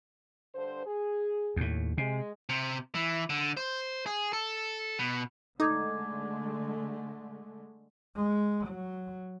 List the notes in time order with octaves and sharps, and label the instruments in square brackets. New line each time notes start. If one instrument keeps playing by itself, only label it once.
[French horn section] G2 D3 C5
G#4
[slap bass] D#2 A2
[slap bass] C3 [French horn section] G#3
[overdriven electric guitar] C3
E3
D3
C5
G#4
A4
B2
[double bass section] D3 G#3 A3 [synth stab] D#4 [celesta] A4 D6 G#6
[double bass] G#3
F#3